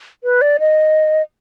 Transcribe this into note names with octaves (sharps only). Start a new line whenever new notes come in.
B4
D5
D#5